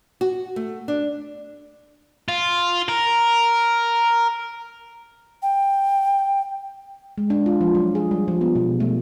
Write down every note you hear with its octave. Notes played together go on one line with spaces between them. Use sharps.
F#4
A3
D4
F4
A#4
G5
G#3
D4
F4
F3
F#3
G#4
G3
F3
B3
B2
A3